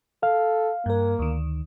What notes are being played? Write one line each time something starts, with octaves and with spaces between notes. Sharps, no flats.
A4 F5
G2 A#3 A#4
D2 D#3